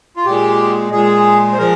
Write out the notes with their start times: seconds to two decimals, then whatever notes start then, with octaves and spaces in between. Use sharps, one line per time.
0.17 F4
0.26 A#2 G#3 G4
0.92 A#2 G#3 G#4
1.53 C5
1.58 F3 G#3 A#4